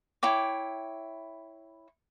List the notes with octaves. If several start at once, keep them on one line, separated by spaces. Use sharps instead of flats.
E4 C#5 G5 D6